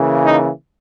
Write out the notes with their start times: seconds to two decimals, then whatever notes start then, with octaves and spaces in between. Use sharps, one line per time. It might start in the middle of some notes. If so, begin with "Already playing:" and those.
Already playing: C#3 E3 A#3
0.25 D#4